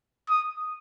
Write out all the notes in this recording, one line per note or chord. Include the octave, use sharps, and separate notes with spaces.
D#6